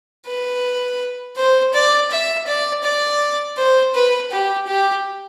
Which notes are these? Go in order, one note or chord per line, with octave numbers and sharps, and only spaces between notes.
B4
C5
D5
E5
D5
D5
C5
B4
G4
G4